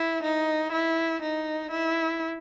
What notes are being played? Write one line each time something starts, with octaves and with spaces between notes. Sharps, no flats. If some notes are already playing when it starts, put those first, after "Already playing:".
Already playing: E4
D#4
E4
D#4
E4